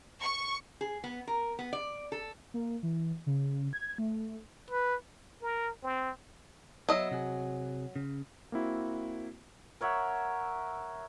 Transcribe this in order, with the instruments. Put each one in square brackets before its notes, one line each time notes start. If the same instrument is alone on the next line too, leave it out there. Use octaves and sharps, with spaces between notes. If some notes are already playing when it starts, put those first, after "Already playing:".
[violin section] C#6
[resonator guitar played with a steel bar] G#4
B3
A#4
B3
D5
A4
[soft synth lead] A#3
E3
C#3
G#6
A3
[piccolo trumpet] B4
[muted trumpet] A#4
C4
[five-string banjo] F#3 D#5 [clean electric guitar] B3 E5
[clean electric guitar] C3 F#4 G#4
C#3
[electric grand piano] A#3 C4 E4 F#4
[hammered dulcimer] A#4 C#5 E5 F#5